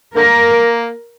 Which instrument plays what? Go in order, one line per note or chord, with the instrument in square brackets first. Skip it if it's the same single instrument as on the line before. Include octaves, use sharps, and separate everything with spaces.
[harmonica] D3 A#3 [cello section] A#4